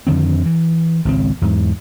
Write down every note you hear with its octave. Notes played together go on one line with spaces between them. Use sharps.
F2 D3 D#3 C4
E3
G#1 C#2 C4
E2 G#2